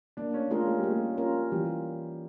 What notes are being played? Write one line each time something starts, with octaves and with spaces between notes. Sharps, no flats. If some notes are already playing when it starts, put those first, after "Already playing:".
A#3 D4
C#4
G#3 C#4 F4 A#4
G#3
G3
A#3
G#3
C#4 F4 A#4
E3 G3